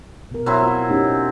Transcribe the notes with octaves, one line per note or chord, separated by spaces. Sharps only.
B2 A#4
F#3 C4 E4
F4
C#4 D#4 G4